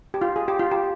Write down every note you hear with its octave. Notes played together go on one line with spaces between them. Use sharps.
G4
F4
G#4
G4
F4
G4